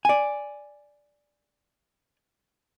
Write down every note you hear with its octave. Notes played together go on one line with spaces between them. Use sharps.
D5 G#5